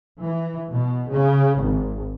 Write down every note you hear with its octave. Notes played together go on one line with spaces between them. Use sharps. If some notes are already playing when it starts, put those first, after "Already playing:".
E3
B2
C#3
G#1